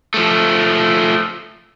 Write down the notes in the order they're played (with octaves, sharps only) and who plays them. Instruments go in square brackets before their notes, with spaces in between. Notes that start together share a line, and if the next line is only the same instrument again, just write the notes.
[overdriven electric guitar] F3 A3